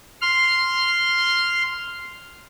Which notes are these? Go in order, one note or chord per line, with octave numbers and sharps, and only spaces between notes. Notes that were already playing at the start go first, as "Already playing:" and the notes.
C6 F6